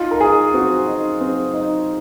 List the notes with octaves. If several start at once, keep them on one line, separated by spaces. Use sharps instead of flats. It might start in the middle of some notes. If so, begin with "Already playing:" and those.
Already playing: D#4 F4
A#4
D#4 G#4
C4 F#4
D#4
C4
D#4